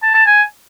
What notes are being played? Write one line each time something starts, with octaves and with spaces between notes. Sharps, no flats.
A5
A5
G#5